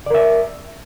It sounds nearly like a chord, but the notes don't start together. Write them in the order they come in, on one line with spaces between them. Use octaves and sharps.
D5 A#4 E5